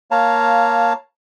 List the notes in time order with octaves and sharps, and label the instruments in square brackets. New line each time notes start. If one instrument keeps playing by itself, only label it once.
[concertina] A#3 C#5 F5 A5 A#5